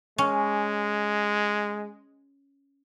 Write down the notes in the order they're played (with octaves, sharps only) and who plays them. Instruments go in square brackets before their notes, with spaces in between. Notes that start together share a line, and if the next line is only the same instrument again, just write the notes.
[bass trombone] G#3 [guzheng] C#4